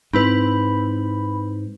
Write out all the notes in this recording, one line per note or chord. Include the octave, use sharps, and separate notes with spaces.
G#2 C4 E4 B4 B5